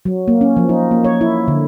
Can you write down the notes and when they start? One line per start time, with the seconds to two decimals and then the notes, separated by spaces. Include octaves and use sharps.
0.05 F#3
0.28 A#3
0.41 C#4
0.57 F3
0.69 D#4
0.91 A#3
1.04 C#5
1.21 E4
1.48 D3